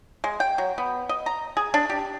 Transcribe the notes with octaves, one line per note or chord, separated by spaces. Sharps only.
G#3
G5
F#3
B3
D#5
A#5
G#4
D4
G4